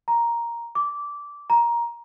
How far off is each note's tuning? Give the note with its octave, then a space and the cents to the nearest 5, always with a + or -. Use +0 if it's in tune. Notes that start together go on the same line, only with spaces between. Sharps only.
A#5 +5
D6 -15
A#5 +15